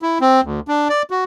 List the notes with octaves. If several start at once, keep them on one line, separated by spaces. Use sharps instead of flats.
E4
C4
D2
D4
D5
F#4